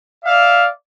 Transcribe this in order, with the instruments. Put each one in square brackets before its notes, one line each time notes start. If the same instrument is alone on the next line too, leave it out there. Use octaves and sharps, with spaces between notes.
[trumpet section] D5 E5 F5